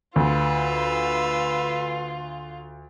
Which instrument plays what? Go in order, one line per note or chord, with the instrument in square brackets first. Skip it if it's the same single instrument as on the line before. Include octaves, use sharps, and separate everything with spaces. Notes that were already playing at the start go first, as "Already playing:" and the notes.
[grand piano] D2 [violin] F4 [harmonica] B4 E6